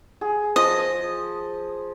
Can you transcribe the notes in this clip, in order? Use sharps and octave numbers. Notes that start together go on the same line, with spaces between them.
G#4
F3 D#5